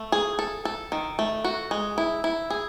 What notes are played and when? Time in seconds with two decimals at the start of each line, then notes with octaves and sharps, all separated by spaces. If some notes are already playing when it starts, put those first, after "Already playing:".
Already playing: A3
0.12 G#4
0.39 A4
0.65 A4
0.92 D#3
1.19 A3
1.44 F#4
1.71 G#3
1.98 E4
2.24 E4
2.50 G#4